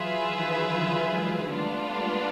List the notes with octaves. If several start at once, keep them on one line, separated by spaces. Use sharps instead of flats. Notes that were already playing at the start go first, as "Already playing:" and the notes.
Already playing: E3 F#3 F4 G#4 B4 E5
D#3 F3
D3 E3
F#3 G#3
G3 A3 B3 D4 F4
G#3 A#3